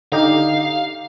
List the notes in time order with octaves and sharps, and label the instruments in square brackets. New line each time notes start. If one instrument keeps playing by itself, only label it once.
[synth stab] D3 D#4 G4 [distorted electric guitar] F5